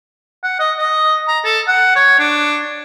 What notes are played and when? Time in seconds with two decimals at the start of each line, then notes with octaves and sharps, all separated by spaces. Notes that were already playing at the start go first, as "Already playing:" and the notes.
0.43 F#5
0.59 D#5
0.78 D#5
1.28 A#5
1.45 A4
1.68 F#5
1.95 C#5
2.19 D4